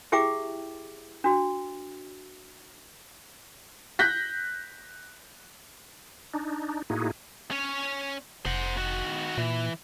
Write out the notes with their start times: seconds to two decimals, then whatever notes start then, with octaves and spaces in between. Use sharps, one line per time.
0.12 E4 G4 G#4 E5 G5 D6
1.24 D4 F#4
3.99 F#6 G6 A#6 B6
6.34 D4 D#4
6.90 A2 A#3 D#4 E4 F#4 G#4
7.51 C#4 C#5
8.46 F1 C5 F#5
8.77 D#3 F#4
9.38 A#2 E3